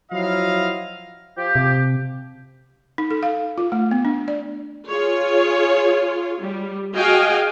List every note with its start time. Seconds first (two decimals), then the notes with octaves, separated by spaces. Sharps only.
0.11 F3 F#3 E4 F4 D#5 F5
1.37 F3 G4
1.55 C3
2.98 D#4
3.11 A4
3.23 F5
3.58 F4
3.72 A3
3.91 B3
4.05 D4
4.28 D5
4.89 F4 G#4 C#5
6.41 G3
6.93 F#4 G#4 D#5 F5 G5 G#5